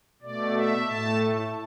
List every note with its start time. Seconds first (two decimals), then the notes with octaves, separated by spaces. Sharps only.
0.22 B2 A3 D5
0.54 E5
0.86 A2 A3 A5